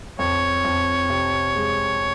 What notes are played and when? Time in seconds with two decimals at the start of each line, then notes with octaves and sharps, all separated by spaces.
0.19 F2 C#5
0.65 F2
1.10 C3
1.55 G#3